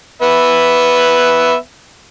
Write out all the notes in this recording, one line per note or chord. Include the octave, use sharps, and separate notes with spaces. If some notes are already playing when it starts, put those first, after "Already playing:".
B3 B4 E5